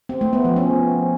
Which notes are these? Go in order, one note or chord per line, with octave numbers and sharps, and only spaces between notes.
C4
A3
B3
F3
C#4